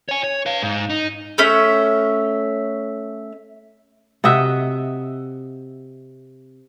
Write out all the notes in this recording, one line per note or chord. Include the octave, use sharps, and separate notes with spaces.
C#5 G#5
C#5
B4 F5
G#2
D#4
A3 C#4 E5
C3 F#4 D#5 E5